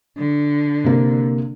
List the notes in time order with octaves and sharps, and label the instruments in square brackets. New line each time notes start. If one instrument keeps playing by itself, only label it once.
[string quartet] D3
[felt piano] C3 A#3